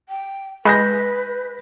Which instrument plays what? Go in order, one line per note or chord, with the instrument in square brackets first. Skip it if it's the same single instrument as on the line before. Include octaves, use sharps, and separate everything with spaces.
[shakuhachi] G5
[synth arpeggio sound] G#3 [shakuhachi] B4 [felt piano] B5 G6 A#6